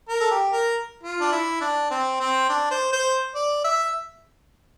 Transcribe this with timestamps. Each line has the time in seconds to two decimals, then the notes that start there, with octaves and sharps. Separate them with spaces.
0.09 A#4
0.21 A4
0.31 G4
0.52 A#4
1.03 F4
1.21 D4
1.32 E4
1.61 D4
1.91 C4
2.20 C4
2.49 D4
2.71 C5
2.93 C5
3.35 D5
3.65 E5